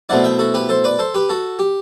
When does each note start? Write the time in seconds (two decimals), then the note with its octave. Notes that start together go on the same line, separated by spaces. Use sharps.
0.09 B2 A3 C4 E4 D5 F#5
0.24 E5 G5
0.39 F#4 A4
0.54 G4 B4
0.69 A4 C5
0.84 B4 D5
0.99 A4 C5
1.14 G4 B4
1.29 F#4 A4
1.59 G4